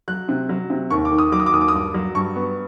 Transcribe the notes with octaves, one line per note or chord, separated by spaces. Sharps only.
F#3 F#6
C3
F#3
C3
D#2 C#6
D6
D#3
D#6
F#3 D6
D#6
D6
D#2 D#6
D6
D#6
G2 D6
F#3
G2 C#6
B3